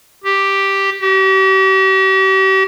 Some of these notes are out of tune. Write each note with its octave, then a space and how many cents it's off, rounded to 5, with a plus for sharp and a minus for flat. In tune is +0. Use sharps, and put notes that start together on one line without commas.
G4 +0
G4 -40